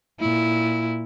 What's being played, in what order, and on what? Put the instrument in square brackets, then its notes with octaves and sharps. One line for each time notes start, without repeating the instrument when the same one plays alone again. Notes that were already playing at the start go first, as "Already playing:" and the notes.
[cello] A#2 E4